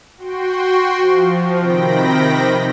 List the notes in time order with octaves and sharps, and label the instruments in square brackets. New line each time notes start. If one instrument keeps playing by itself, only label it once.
[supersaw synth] F#4 G5 C6
F3
C3 D#3 G5 B5 A#6